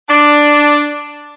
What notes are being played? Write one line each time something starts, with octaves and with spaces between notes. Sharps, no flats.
D4